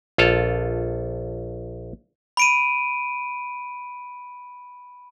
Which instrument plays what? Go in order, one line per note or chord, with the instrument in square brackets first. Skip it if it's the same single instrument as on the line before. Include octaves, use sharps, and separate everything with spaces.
[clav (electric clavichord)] A#1 F4 A4 F5
[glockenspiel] B5 D7 D#7